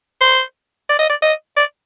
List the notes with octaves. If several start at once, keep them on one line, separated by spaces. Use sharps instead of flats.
C5
D5
D#5
D5
D#5
D5